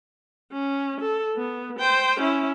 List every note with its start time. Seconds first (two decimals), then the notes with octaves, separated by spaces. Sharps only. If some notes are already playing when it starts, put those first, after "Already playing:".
0.52 C#4
1.00 A4
1.37 B3
1.79 C5 G5
2.20 C#4 E4